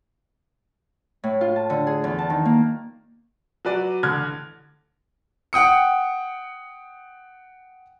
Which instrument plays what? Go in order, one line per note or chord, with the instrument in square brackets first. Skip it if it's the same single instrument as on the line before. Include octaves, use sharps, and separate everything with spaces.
[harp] A2
F4
A5
D3
G#4
E2
A5
D#3
A#3
[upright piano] F#3 F#4 B4 D5
A1 D3 F6 F#6 G#6
[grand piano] F#5 G5 D#6 C#7